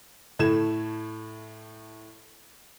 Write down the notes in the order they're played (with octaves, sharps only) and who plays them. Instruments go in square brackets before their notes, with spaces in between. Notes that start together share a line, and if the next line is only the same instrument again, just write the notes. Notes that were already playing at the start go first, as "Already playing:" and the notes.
[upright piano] A2 A3 G#6 E7